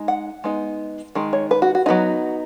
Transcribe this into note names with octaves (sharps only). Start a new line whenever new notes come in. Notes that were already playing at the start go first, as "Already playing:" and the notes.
Already playing: G#3 D#4
F#5
G#3 B3 D#4
D#3 G#3
C#5
B4
F#4
F#4
F#3 B3 D#4 F#4